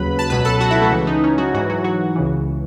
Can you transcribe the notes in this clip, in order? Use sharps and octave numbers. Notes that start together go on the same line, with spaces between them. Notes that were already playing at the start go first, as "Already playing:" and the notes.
Already playing: D#2 C#3 F#3 B4 B5
A5
C#2 B2 F#3 B4 B5
A4 A5
F#4 F#5
E4 E5
A3 A4
C#2 C#3 E3
D#4
C#4
F#3 F#4
G#2 E3 F#3 F#4
F#3 F#4
F#3 F#4
C#2 C#3 E3